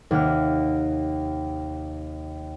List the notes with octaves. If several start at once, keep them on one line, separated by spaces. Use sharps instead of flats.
D#2 C3 F#5 F6